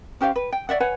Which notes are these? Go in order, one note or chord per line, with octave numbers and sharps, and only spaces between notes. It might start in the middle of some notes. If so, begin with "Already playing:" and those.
C#4 G4 C5 F5
B4
G5
C#5 D5 E5 F#5
B4 C#5 F#5 G#5